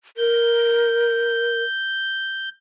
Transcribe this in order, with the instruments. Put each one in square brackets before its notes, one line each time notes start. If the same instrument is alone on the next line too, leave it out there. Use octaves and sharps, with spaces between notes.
[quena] A#4 [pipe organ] G6